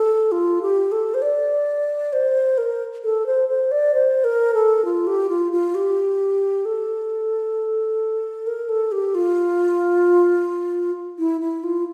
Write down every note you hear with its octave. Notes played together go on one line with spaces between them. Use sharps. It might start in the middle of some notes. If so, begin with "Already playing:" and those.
Already playing: A4
F4
G4
A4
C5
D5
C5
A#4
A4
C5
C5
D5
C5
A#4
A4
F4
G4
F4
F4
G4
A4
A#4
A4
G4
F4
E4
E4
F4